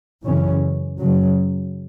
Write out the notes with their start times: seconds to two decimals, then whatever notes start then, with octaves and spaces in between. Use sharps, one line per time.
0.23 F#2 C#3 E3 C#4
1.00 F#2 C#3 F#3